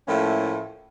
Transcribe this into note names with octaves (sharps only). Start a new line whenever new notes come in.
A2 F3 A3 A#3 C#4 E4